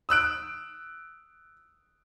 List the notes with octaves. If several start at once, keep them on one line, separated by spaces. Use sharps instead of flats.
D#6 E6 F#6 D7